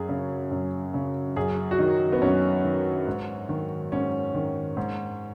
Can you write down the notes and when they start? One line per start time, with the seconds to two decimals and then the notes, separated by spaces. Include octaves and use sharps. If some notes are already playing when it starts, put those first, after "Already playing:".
Already playing: F#2 G#4
0.09 C#3
0.51 F#2
0.94 C#3
1.36 F#2 G#4
1.71 F#4
1.79 D#3 D#4
2.13 B3
2.22 F#2 C#4
2.64 D#3
3.07 G#2
3.49 D#3
3.92 G#2 C#4
4.35 D#3
4.77 G#2